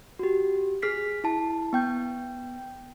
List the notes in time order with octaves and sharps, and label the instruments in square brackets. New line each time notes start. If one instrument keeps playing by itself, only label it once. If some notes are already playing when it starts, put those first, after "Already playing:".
[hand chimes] F#4 G4
G#4 F6 B6 C7
E4 A5
B3 G5 G6